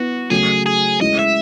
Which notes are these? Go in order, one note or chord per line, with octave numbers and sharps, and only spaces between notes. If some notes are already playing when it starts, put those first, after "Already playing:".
Already playing: B3 E4 F#4 B4
C#3 F#3 A3 G#4
G#4
G#3 C#4 E4 D#5
E5